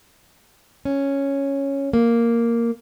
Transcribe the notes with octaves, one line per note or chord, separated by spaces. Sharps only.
C#4
A#3